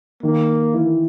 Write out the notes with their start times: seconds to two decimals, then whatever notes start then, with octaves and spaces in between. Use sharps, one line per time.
0.23 D#3 A#3
0.73 E3